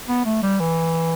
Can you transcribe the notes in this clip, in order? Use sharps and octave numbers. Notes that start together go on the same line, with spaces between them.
B3
A3
G3
E3